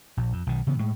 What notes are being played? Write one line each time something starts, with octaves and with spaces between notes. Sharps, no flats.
A#1
F2
B1 D#3
C#3 E3 B3
A2 G#3